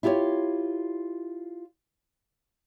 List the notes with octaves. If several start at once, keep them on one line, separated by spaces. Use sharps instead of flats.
E4 F4 G4 A4 C#5